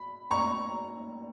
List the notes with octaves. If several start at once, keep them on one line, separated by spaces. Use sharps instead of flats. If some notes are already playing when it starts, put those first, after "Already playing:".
Already playing: B5
A#5 C#6